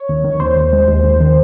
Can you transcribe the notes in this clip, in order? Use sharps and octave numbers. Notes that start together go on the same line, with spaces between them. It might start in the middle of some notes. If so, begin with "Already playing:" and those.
Already playing: C#5
D#2
D#3
D#2 C5
D#2
G#3
D#2
D#2
D#3